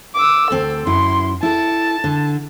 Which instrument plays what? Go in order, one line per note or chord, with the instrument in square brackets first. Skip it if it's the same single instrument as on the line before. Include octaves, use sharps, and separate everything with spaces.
[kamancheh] D6 E6
[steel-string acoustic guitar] D2 C4 [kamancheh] A4
[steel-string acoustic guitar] F#2 E4 [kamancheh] C6
[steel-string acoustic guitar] E4 A4 [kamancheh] A5
[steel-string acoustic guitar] D3